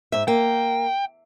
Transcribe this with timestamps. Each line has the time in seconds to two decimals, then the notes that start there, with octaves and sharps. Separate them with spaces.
0.12 G#2 E5
0.28 A#3 G5